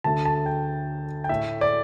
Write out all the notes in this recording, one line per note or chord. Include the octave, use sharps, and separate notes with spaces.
D2 D3 A3 A5
A5
G5
G5
A2 A3 E5
D5